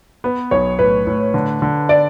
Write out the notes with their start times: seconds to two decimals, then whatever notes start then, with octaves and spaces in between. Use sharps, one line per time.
0.24 B3 B4
0.51 B1 C#5
0.79 A2 B4
1.07 A2
1.34 D3
1.62 D3
1.89 D5